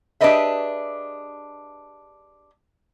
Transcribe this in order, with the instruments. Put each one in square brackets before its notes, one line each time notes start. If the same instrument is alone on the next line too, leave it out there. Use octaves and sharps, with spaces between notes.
[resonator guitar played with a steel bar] D4 G4 G#4 B4 D#5 E5